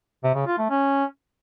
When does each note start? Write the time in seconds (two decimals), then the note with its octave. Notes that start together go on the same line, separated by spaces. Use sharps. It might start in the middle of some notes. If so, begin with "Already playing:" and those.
0.23 C3
0.35 C#3
0.47 F4
0.58 A3
0.70 C#4